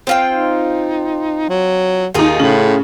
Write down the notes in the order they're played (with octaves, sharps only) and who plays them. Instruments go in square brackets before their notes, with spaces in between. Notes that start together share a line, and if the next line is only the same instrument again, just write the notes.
[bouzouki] C4 F4 G5
[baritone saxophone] D#4
F#3
[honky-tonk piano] D#2 D#4 [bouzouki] F4 G#4
[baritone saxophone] A2 [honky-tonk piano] C#3 F#7